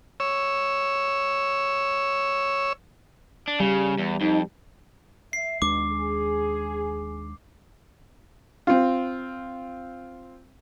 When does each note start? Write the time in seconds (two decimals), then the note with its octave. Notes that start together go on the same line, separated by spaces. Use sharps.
0.20 C#5 E6
3.48 D4
3.60 C#3 G3
3.98 E2
4.21 F2 D#4
5.33 E5 C7
5.62 D#2 B2 G#3 D4 D6
5.91 G#4
8.67 C4 F4